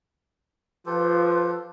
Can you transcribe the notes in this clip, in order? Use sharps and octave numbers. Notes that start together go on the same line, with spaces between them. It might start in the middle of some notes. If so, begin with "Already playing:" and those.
F3 F4 G4 A4 B4